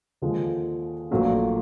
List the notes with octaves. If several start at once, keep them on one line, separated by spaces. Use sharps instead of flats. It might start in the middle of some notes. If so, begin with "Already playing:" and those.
D#2 D3 F3 G#3
A#1 A#2 F#3 A3